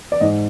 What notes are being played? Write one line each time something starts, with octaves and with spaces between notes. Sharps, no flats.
D5
G#2 D#5